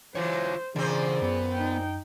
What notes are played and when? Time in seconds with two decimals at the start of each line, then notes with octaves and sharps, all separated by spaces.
0.15 E3 F#3 F4 C5 C#5
0.76 A#2 C#3 E3 C4 D4 G#4 C5 D5
1.22 F#2 B3
1.53 D#4 G5